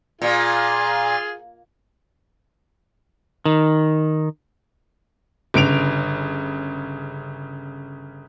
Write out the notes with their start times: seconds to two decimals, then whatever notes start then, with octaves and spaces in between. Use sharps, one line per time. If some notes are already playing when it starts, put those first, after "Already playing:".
0.22 A#2 F4 G#4
3.45 D#3
5.54 G1 C#3 D7 F7